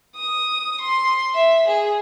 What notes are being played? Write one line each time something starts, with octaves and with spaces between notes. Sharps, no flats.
D#6
C6
E5
G#4